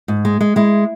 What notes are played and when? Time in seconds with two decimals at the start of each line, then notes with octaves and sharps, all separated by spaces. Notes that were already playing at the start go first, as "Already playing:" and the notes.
0.08 G#2
0.25 G#3
0.41 G#3
0.56 G#3 E4